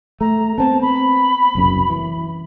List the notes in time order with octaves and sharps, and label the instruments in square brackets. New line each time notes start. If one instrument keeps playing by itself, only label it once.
[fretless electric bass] A3 [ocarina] A#5
[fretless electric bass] B3 C4 [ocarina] A5
[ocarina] B5
[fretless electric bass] F#1 C2 F#2
E3